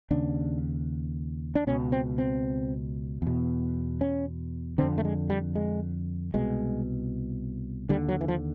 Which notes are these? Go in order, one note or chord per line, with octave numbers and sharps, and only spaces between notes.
D#2 C#3 D4
D4
C#2 B2 C#4
C4
C4
E2 B2
C#4
F2 D3 C4
A3
G#3
G3
G#3
C2 B2 G#3
D#2 D3 G3
F#3
E3
F3